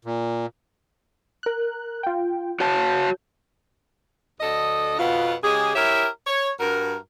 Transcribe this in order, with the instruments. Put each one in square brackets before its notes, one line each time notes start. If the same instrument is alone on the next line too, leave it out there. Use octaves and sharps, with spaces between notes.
[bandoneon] A#2
[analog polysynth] A#4 F#6
F4 G5
[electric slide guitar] F#4 C#5 A5 [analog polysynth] G6
[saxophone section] D2 D3 A4 D#5
F2 B2 B3 F4
C#3 G#3 G4 G#4
E4 G4 A#4 C#5 E5
C#5
G2 F#4 A#4